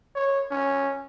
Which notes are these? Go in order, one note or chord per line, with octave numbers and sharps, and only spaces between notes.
C#5
C#4